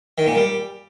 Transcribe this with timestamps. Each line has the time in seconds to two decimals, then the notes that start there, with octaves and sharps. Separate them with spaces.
0.18 D#3
0.27 A#2
0.35 G3